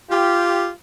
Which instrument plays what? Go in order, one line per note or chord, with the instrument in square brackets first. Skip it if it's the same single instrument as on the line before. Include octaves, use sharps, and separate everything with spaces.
[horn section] F4 G4